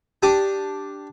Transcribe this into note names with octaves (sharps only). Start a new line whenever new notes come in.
D4 G4 D#6